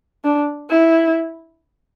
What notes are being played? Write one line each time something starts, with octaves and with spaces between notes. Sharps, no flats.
D4
E4